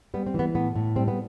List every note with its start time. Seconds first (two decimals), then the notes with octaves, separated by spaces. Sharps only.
0.14 G3 B3
0.26 C4
0.34 E3 B3
0.55 A2 B3
0.76 A2
0.96 G3 C4
1.08 B3